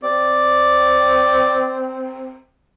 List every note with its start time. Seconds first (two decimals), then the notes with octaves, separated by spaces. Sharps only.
0.03 C4 D5